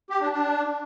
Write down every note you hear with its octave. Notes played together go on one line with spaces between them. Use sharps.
G4
D4
D4